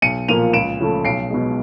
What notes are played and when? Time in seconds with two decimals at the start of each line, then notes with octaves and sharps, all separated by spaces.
0.02 B1 C#7 D#7
0.28 A#2 F3 A#3 D#7 F7
0.53 C#2 D7 E7
0.80 C#3 F3 A3
1.05 B1 C7 D7
1.30 B2 G#3